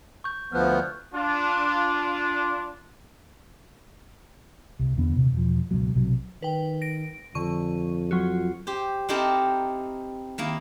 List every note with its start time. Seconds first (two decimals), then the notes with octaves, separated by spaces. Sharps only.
0.24 C#6 G6
0.52 D2 F3 B3 F6 F#6
1.15 D4 F4
4.79 C2
4.98 E2 D3 B3
5.16 D#1 C3
5.32 E1 F3
5.71 C#2 G#2 B2 F#3
5.94 B1 C3 F#3
6.42 D#3 B4 G5
6.82 A#6 D7
7.35 F2 D3 C#6 D#7
8.11 F#3 F4 F#4
8.67 G4 C5
9.09 C4 D#4 E4 G4 A4 A#4
10.38 D#3 A#3 E4